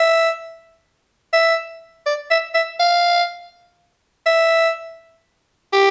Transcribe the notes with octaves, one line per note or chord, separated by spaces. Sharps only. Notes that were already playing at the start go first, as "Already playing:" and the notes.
Already playing: E5
E5
D5
E5
E5
F5
E5
G4